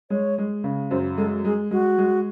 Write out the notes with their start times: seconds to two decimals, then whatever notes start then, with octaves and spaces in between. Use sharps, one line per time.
0.10 G#3 C#5
0.38 G#3
0.64 C#3
0.91 F#2 C5
1.18 G#3 A4
1.45 G#3 G#4
1.71 G#3 F#4
1.98 G#3